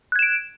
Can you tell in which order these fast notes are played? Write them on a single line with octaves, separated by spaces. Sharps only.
F#6 G#6 E7 D7